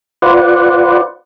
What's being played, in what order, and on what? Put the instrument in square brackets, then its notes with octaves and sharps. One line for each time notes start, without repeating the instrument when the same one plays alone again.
[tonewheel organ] F4 B4 C5 D5 F#5